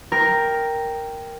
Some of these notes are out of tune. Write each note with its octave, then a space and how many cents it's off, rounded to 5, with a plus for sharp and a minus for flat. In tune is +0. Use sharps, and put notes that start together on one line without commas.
A#4 +0 G5 +0